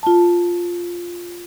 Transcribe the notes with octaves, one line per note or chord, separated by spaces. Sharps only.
F4 A5